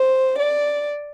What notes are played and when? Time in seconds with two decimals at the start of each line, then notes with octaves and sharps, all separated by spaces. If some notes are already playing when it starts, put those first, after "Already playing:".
Already playing: C5
0.38 D5